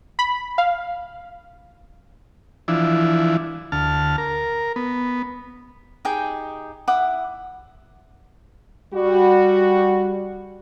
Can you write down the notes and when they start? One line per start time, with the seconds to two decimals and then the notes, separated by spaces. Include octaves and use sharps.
0.19 B5
0.58 F5
2.68 E3 F3 D4 E4
3.72 D2 A5 F6
4.18 A#4
4.76 B3
6.05 D#4 G4 G#4 G5
6.88 E4 F#5 D6 D#6
8.94 G3 F#4